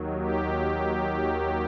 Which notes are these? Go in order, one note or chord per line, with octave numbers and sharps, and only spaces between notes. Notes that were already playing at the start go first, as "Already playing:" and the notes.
Already playing: D#2 D#3 F#3
G4